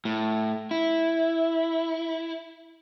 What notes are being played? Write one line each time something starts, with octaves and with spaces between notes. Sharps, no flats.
A2
E4